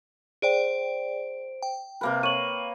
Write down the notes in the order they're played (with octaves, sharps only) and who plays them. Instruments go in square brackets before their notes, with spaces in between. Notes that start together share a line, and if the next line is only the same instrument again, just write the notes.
[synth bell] G#4 D5 G5 [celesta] C5 D7
[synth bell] G5
[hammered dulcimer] C3 A#3 B4
[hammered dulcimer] C#5 [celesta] D#7 F#7